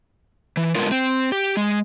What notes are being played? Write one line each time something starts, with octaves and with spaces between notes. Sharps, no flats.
E3
D3 G#3 B3 F4 A#4
C4
G4
G#3